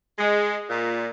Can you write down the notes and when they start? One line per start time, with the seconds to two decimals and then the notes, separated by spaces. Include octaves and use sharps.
0.19 G#3
0.69 A#2